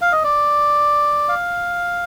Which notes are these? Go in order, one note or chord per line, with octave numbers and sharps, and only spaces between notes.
F5
D#5
D5
F5